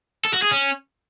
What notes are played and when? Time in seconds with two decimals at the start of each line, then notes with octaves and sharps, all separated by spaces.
0.25 A4
0.34 F#4
0.42 G#4
0.51 C#4